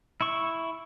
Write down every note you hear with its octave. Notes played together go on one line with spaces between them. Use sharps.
E4 C#6